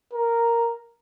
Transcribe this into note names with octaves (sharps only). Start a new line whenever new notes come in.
A#4